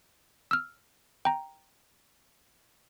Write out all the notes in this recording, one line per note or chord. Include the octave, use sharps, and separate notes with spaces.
E6 F6
G5 A#5